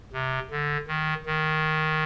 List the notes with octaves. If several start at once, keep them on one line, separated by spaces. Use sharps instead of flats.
C3
D3
D#3
D#3